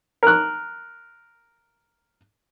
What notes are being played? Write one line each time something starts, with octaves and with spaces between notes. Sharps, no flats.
A#4 F#6